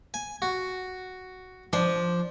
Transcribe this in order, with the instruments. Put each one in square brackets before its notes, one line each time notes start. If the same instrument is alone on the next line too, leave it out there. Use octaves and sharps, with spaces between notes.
[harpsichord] G#5
F#4
[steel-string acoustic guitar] F3 [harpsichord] D4